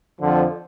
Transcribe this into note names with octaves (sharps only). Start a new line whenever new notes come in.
F2 D3 F3